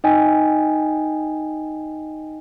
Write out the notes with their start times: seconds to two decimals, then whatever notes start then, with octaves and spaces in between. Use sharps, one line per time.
0.04 D#4 D#5 G5 G#5